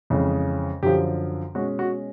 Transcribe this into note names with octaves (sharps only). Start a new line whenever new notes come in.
F2 C#3 E3 G#3
F#2 D3 F3 G4
B2 G#3 C#4 F#4
F#4